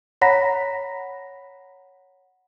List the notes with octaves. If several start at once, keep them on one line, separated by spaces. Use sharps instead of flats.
C#5 F#5 A#5 B5 A#6 B6